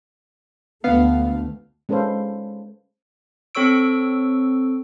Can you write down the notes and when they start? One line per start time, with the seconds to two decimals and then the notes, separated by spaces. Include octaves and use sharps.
0.84 D2 A3 B3 F5
1.89 G#3 C#4 A4 B4 C5 F5
3.55 C4 A4 C#5 C#6 E6 D7